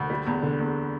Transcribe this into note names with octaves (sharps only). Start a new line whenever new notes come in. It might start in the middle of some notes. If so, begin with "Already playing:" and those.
Already playing: D2
G3
E2
D3
E2